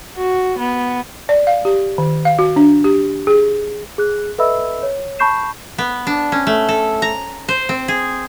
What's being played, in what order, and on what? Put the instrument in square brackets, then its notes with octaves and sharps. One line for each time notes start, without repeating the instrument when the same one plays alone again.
[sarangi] F#4
B3
[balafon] D5
F5
G4
D#3
F5
F#4
D4
G4
G#4
[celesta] G#4 F#6
A4 B4 D#5 E5 B5 E6
C#5
A5 B5 C#6 G6 C7 E7
[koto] B3
D4
C#4
A3
A4
A#5
C5
C4
G#4